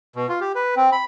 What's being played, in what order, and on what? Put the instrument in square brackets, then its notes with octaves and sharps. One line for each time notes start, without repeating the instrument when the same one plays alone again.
[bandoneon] B2
F4
G4
B4
C4
B5